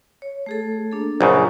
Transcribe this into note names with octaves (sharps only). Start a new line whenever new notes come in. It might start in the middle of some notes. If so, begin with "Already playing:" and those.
C#5
A3 G#4 A4
A#3 D4 A4
A#1 F#2 C#3